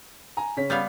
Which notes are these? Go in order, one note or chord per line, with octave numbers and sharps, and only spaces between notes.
G#5 A#5
C#3 C#5 B6
G3 B3 F5